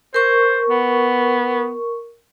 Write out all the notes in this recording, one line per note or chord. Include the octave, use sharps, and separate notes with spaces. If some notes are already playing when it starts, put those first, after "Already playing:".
A#4 C5 C#6
B3